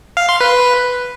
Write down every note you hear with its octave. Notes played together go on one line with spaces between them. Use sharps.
F5
C6
B4